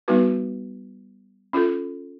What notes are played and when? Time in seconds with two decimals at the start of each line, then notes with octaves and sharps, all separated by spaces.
0.08 G3 B3 D#4 F#4 B4
1.53 C#4 F4 A4